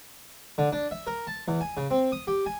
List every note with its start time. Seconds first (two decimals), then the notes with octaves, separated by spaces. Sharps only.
0.58 D3
0.72 D4
0.91 E5
1.07 A#4
1.27 A5
1.48 E2
1.61 G#5
1.77 C#3
1.91 C4
2.12 D#6
2.27 G4
2.46 G#5